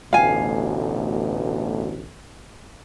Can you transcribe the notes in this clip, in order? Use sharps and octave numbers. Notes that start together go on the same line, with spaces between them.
A1 D2 B2 F5 G#5